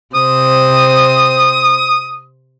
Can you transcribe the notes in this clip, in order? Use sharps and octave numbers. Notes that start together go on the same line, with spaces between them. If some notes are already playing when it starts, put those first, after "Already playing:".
C3 C5 D#6